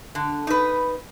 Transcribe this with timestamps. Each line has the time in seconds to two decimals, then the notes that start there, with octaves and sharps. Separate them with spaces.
0.15 D3
0.47 D#4 B4